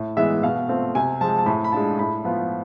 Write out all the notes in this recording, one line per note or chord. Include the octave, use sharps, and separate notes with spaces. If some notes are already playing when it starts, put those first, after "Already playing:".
Already playing: A2
E3 G#3 B3 E5
B2 F5
A3 C4 F4
C3 G#5
F3 G#3 A5
A5
A2 B5
B5
G#3 D4 F4 A5
A2 B5
F3 B3 F4